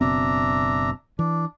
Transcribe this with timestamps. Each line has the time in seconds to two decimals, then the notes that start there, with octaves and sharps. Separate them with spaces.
0.01 F#1 B2 C4 D4 E5 A#5
1.19 E3 D4